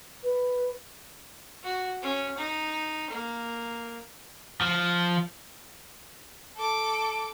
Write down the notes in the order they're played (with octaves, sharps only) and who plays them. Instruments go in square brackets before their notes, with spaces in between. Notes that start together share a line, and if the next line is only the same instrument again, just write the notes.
[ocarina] B4
[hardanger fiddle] F#4
C#4
D#4
A#3
[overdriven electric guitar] F3
[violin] A4 D6